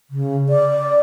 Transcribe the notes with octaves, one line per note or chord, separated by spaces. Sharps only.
C#3
D5